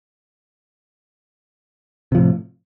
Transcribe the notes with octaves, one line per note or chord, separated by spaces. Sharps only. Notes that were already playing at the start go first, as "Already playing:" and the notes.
A2 C3 F3